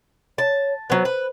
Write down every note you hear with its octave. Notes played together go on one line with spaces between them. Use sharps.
C#5 A5
F#3 B3 C5
B4